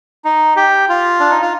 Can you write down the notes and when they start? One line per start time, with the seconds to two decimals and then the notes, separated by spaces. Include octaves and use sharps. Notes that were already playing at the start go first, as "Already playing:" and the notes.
0.25 D#4
0.56 G4
0.89 F4
1.20 D4
1.30 D#4
1.42 F4